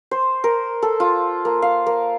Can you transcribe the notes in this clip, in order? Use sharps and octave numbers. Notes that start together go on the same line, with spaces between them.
C5
A#4
A4
F4
A#3
F5
A#3